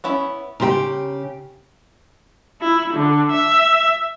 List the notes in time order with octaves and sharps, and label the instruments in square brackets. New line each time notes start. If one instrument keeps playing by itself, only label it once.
[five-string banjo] B3 C#4 E4
[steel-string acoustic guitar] C#3 G4 [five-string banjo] A#4 C5 G5
[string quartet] E4
D3
E5